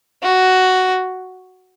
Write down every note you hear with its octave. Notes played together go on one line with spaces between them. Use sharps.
F#4